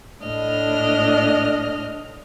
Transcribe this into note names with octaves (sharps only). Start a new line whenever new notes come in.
A2 D4 D#5 F6